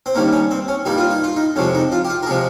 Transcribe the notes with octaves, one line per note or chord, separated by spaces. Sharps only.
C4
G2 D#3 A#3 C#4
C#4
C4
C#4
G2 G3 A#3 D#4
F4
D#4
F4
D#4
F2 C3 F3 G#3 C#4
D#4
F4
G4
F4
A#4
C3 F3 G#3 G#4